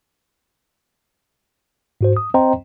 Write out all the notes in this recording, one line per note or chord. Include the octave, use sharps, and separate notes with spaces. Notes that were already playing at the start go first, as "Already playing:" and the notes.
G#2 F#4 C5
D#6
C4 C5 D#5 G5 A#5 C6